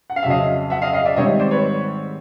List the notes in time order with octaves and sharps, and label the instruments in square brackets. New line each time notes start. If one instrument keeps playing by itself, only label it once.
[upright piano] F#5
F5
F2 C#3 F#3 E5
D#5 F5
E5 F#5
D#5 F5
D#5 F5
D5 E5
G#2 D#3 G3 C4 C#5 D#5
C5 D5
B4 C#5